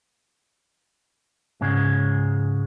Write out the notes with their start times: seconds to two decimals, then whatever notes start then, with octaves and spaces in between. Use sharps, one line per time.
1.61 G#2 C#3 G#3